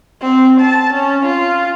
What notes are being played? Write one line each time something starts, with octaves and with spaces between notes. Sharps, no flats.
C4
A5
C#4
F4